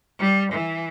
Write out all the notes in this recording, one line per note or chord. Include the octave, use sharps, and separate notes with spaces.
G3
E3